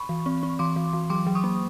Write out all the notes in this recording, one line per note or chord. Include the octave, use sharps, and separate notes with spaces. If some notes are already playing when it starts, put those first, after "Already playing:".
Already playing: B5 C#6
E3
C4
C4
E3 C6 D6
E3
E3
F#3 C6 D6
F#3
C#6 D#6
A#3